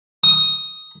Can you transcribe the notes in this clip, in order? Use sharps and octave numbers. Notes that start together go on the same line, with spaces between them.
D#6